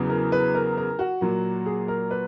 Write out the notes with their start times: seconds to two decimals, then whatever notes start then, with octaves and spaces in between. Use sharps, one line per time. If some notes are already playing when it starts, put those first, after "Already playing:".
Already playing: E2 C#3 F#3 B3
0.10 A#4
0.32 B4
0.55 A#4
0.77 A#4
0.99 F#4
1.21 A#2 F#3 A#3
1.66 G#4
1.88 A#4
2.11 B4